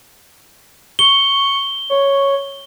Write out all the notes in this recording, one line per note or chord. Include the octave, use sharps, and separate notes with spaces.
C#6 G7
C#5